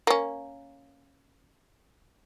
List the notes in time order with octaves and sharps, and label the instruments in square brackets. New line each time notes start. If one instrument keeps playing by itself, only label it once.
[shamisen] A#3 C#4